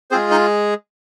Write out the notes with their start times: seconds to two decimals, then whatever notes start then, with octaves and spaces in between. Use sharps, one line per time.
0.11 G#3 C4 F4 G#4 C5
0.31 D#4 D#5